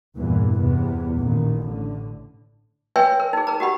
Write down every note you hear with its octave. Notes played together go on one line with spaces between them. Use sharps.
E2 G2 A#2 E3
E2 C3 B3
A1 A#2 D#3
A2 D3
B4 C#5 E5 G5 G#5 C6
A#4
D#4 G#4
A#4 A#5
F#4 G4 F#5 B5